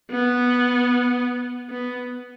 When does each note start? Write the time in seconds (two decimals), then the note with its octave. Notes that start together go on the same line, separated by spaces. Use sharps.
0.11 B3
1.71 B3